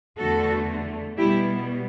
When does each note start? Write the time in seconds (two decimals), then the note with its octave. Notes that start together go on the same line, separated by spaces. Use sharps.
0.18 E2 D3 A3 F#4 A4
1.17 B2 G3 B3 E4 G4